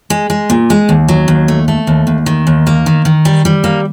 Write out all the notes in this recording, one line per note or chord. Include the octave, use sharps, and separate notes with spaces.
G#3
G#3
A#2
G#3
D#2
F#3
D#2
A3
A3
D#2
D#2
D#3
D#2
A#3
D#3
D#3
G3
G3
A#3